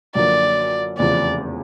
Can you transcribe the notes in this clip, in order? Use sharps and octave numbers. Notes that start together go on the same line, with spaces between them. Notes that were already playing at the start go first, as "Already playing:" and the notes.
F#2 D3 F3 A#3 D5
F1 E2 C#3 F3 D5